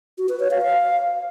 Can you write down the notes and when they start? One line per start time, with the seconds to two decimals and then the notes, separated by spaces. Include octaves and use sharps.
0.18 F#4
0.29 B4
0.40 C#5
0.51 F5
0.62 F5